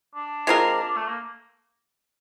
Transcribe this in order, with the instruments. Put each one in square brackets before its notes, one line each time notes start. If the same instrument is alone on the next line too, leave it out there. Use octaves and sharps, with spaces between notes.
[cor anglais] D4
[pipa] G#3 C4 F4 A#4
[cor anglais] A3
A#3